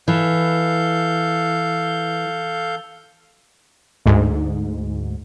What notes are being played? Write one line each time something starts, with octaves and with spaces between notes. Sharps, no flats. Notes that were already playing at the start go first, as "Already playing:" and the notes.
E3 A4 F5 G6
D2 G#2